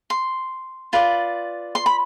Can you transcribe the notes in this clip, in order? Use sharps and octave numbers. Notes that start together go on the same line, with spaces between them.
C6
F4 B4 D5
C6
B5